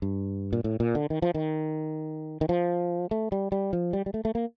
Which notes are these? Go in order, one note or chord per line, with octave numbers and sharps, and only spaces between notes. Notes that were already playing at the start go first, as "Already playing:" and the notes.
G2
A#2
A2
A#2
D3
D#3
F3
D#3
D#3
F3
A3
G3
G3
F3
G3
G3
A3
A3
A#3